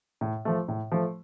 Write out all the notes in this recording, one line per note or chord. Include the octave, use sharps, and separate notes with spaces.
A2
F3 A3
A2
F3 A3